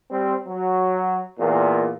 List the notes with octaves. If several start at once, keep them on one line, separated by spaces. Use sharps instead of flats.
G3 C4
F#3
E2 A#2